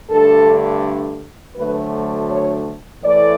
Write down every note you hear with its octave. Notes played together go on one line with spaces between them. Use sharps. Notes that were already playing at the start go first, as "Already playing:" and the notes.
G2 D3 A3 A4
D2 D3 F#3 A3 B4
C#5
A2 E3 A3 D5